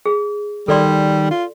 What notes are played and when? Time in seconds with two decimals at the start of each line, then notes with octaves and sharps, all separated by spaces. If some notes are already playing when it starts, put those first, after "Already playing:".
0.06 G#4
0.68 D#3 G3 A4 D5 C6
1.31 F4